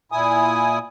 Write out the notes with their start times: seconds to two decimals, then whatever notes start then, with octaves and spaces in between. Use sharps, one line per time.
0.12 A#2 E4 G#5 D#6